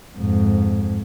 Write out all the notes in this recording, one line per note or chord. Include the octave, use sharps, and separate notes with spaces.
F2 G#2